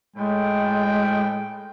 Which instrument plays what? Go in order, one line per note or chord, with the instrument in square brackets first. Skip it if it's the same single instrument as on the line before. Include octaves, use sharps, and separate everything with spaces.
[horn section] A2 G5 [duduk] G#3